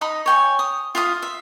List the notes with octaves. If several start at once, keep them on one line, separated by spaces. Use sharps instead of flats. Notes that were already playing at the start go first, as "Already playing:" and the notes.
D#4 D#5 A#5 B5
C#5 G5 G#5
D#6
F4 E5 F5 D#6
E5